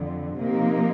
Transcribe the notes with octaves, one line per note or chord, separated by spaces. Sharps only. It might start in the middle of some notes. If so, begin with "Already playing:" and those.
Already playing: F2 D3 F3
C3 F3 A#3 D#4